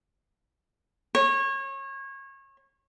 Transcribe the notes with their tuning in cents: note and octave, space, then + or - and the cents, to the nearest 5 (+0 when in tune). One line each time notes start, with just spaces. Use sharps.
C#5 -30